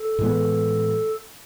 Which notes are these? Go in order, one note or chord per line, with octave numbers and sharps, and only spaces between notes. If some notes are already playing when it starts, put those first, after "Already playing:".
Already playing: A4
A2 E3 G#3 B3